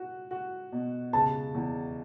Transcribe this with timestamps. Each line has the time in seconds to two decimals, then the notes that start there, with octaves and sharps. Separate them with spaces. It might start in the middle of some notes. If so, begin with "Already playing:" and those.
Already playing: F#4
0.31 F#4
0.72 B2
1.13 C#3 A5
1.55 E2